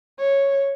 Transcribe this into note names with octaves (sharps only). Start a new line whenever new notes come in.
C#5